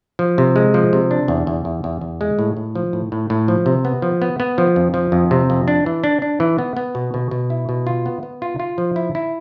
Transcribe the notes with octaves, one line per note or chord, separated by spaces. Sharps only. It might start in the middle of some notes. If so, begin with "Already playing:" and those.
F3
C3
G#3
F3
C3
D4
E2
E2
E2
E2
E2
G#3
A2
A2
F3
A2
A2
A2
F3
C3
B3
F3
B3
B3
F3
F2
F3
F2
C3
F2
D4
E3
D4
D4
E3
B3
B3
B2
B2
B2
E4
B2
F4
B3
B3
F4
F4
F3
E4
E4